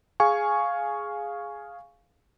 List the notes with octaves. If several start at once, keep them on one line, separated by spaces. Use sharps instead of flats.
G#4 F5 G#5 C#6